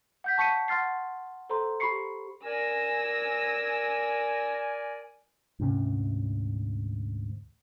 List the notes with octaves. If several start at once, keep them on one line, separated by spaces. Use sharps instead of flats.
F#5 G6 B6
A5 C#6 B6 C#7 D#7
F#5 C6 F6 A6 C7
A4 C5 A#5 C6
G4 B5 C#6 C7 C#7
A#4 D5 G#5 E6 A#6
D2 G#2 C3 C#4